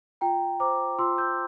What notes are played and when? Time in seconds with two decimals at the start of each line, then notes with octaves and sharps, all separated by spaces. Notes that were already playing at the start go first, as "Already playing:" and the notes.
0.21 F4 G5 A#5
0.60 C5 A#5 D6
0.99 F4 C6 E6
1.18 E6 G6